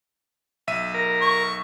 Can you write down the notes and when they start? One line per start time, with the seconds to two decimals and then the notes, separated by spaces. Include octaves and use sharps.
0.67 B1 E5 D#7
0.94 A#4
1.21 C#6